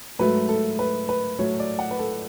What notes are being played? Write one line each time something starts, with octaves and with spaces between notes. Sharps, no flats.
G#2 F#3 A3 B4
A4
B4
B4
A2 F#3 A3 C#5
D5
F#5
B4
A4